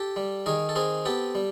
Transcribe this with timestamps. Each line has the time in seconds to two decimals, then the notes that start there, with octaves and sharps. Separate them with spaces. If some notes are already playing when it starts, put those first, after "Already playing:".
Already playing: G4 A4
0.16 G3
0.46 D#3 G#4 A#4
0.69 A4
0.76 C4 G#4 A#4
1.05 B3 G4 A4
1.35 G3